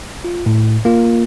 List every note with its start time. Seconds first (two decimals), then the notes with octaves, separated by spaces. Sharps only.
0.25 F4
0.46 A2
0.85 A#3 F4